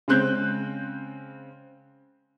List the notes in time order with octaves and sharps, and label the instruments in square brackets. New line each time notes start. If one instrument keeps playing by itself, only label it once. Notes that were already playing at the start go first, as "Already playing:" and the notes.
[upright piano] C#3 G#3 C4 F#6 G6